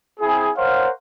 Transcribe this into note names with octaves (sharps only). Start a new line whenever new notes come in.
C4 E4 G#4
A#4 C5 C#5 F5 F#5